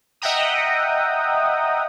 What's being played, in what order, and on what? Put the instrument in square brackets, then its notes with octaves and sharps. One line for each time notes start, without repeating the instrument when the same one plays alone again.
[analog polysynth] D#5 E5 F#5 G5 A#5 D#6